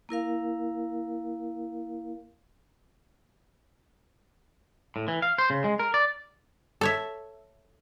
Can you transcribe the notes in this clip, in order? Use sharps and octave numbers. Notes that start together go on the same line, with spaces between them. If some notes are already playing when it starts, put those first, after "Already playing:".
A#3 E4 A#4 F5
A2
E3
F5
C5
C#3
G#3
A#4
D5
A4 C#5 E5